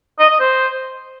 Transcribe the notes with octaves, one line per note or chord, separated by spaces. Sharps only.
D#5
D#5
C5